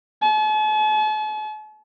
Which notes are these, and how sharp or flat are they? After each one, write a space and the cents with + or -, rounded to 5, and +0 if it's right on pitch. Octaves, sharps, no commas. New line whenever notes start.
A5 -45